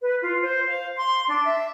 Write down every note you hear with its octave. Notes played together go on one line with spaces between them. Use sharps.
B4
F4
C5
F5
C6
D4
E5